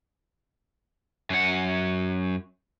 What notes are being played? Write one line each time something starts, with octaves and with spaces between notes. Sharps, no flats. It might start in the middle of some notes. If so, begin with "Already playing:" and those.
F#2 F#5